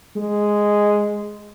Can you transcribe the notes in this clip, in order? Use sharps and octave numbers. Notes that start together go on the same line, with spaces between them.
G#3